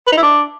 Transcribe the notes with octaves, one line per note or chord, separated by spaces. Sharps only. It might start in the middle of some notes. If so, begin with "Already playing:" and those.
B4
D#4
E4
D4